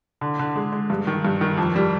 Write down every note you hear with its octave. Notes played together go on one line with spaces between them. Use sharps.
D3
D3
G#3
G#3
G2
D#3
G2
D#3
F2
G3